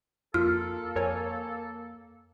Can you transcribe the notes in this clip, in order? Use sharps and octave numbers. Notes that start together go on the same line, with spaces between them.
F2 A#3 F4 A4 F6
F2 A#4 C#5 G#5